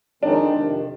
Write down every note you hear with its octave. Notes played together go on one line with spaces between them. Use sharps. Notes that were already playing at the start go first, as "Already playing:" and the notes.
F2 D#3 G#3 C4 D4 D#4
F2 C3 D#3